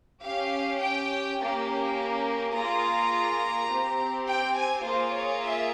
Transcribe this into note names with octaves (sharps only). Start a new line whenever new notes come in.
C#4 G4 F5
G5
A#3 C#4 G4
A#3 F4 G#4 A#5
C4 G4
G5
G#5
A#3 F4 G#4 C5
C#5
E5